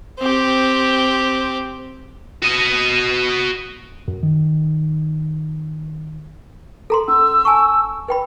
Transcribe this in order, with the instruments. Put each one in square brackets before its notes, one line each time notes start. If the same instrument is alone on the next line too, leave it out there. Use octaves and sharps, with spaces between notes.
[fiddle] C4 G4
[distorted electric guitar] F#4 D#5
[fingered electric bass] F#2
D#3
[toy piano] A4 A#5 C6
[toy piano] C#4 [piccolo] E6
[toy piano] G#5 A5 C#6
B4 G5 B5